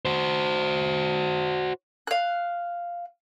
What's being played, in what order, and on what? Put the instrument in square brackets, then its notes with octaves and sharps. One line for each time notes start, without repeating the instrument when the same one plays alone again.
[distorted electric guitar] F#4 C5
[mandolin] F5 F#6